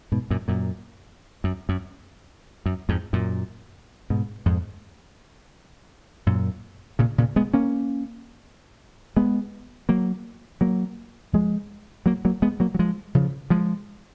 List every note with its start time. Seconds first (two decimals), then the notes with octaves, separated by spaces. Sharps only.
0.12 G#2 B2
0.30 F#2 A#2
0.48 F#2 A#2
1.44 F#2
1.69 F#2
2.66 F#2
2.89 F2 G#2
3.13 F#2 A#2
4.10 G#2 B2
4.46 F2 G#2
6.27 F#2 A#2
6.99 A#2 C#3
7.18 A#2 C#3
7.36 G#3 B3
7.54 A#3 C#4
9.17 G#3 B3
9.89 F#3 A#3
10.61 F#3 A#3
11.33 F3 G#3
12.06 F#3 A#3
12.25 F#3 A#3
12.42 G#3 B3
12.60 F#3 A#3
12.75 F#3
12.79 F3 G#3
13.15 C#3 F3
13.50 F3 G#3